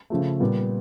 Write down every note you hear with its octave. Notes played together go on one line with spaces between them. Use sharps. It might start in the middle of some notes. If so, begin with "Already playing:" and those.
C#3 F3 A3
A#2 G3 B3